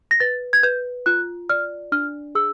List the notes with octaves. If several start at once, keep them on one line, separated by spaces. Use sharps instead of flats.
A#6
B4 A6
G#6
B4 G6
F4 F#6
D5 F6
D4 F6
G#4 E6